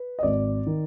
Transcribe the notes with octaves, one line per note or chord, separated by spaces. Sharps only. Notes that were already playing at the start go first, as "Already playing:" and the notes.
Already playing: B4
D#5
G#1 D5
D#3